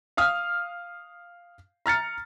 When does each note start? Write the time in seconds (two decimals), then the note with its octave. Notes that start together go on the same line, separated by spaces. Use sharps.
0.17 F5 D#6 F6
1.86 A#5 F6 A6 C#7